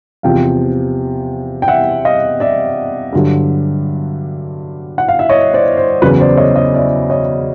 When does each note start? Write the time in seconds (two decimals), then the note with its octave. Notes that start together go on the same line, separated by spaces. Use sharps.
0.23 E2 C3 F3 F5 G5
1.62 G5
1.68 E5 F#5
2.05 D#5 F5
2.40 D5 E5
3.13 G2 D3 F#3
4.98 F#5
5.08 F5
5.19 E5
5.29 C#5 D#5
5.54 C5 D5
5.77 C5
6.02 E2 C#3 F#3 B4
6.20 C5 D5
6.37 C#5 D#5
6.56 C#5 D#5
6.74 D5 E5
7.10 C#5 D#5